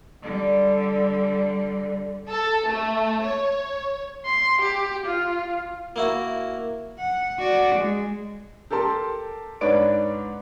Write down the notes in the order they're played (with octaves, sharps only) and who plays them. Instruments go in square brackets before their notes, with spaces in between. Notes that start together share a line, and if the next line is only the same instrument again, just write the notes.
[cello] D3 G3
[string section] A4
A3
C#5
[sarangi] C6
G4
F4
[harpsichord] A#3 E4 F#4
[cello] F#5
F#4 D5
G#3
[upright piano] G4 A4 A#4 A5 C6
G#2 D4 B4 C#5 D5 D7